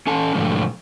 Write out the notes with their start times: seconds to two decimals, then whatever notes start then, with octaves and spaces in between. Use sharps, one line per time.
0.07 C#4 A4 A5
0.35 G#2 B2 D3 F3 F#3 A3